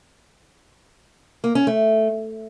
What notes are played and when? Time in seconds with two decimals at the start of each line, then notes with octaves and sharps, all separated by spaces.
1.44 A#3
1.55 C#4
1.67 A3